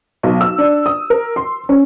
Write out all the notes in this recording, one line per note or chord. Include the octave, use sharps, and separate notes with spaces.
B1
E6
D4
D#6
A#4
C6
C#4